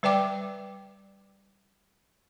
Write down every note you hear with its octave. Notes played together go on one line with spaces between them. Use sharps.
G3 B4 D5 G5 D6